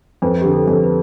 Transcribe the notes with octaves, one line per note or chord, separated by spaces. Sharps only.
F2 B4
D3 G4
A4
F2
B4